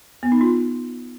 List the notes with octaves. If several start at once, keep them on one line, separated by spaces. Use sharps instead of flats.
B3
D#4
F4